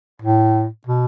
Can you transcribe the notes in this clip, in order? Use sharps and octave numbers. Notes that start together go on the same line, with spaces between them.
A2
B2